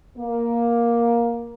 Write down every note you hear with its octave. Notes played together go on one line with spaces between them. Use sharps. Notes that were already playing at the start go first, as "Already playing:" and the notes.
A#3